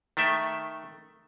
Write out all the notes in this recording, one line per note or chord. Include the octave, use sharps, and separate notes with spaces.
D#3 A3 E5 G5